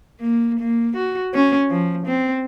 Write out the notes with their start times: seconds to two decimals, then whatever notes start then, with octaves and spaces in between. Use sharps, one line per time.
0.20 A#3
0.59 A#3
0.96 F#4
1.34 C#4
1.70 F3
2.06 C4